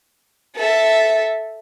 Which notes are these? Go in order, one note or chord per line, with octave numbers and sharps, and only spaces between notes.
A4 E5